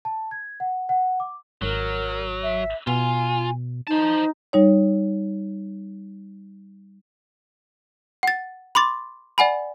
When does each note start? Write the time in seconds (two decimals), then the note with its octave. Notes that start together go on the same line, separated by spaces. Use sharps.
0.05 A5
0.31 G#6
0.60 F#5
0.89 F#5
1.20 D6
1.62 G#1 F#3 A#4
2.42 E5
2.87 B2 F4 G#5
3.87 D#4 C5 A5
4.53 G3 D#4 C#5
8.23 F#5 A6
8.75 B5 C6 D6 A6
9.38 D5 F#5 G#5 B5